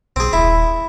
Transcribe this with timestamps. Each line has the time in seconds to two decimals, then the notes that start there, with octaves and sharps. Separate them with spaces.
0.16 B1 C4 G#4
0.33 D#1 E4